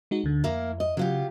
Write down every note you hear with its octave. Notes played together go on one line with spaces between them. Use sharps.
G#3 D#4 F#4
D2 D3
F2 A#3 E4 A#4
D#5
C#3 F#3 F4 G4